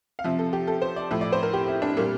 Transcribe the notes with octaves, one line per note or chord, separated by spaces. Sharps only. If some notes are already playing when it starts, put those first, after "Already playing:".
F5
C3 F3 E5
A4
G4
A4
C5
D5
A2 F3 E5
D5
C5
A#4
G4
E4
D4
A#2 G3 A#3